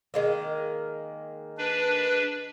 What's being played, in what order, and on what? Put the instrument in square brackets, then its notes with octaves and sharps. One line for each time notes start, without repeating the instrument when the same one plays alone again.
[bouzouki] D#3 G#3 A#3
[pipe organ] D4 B4